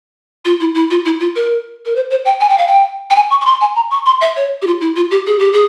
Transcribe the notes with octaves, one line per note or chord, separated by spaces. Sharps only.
F4
E4
E4
F4
E4
F4
A#4
A#4
C5
C5
G5
G#5
G5
F5
G5
G5
G#5
C#6
C#6
C6
G#5
A#5
C#6
C6
E5
C#5
G4
F4
E4
F4
G4
G#4
G4
G#4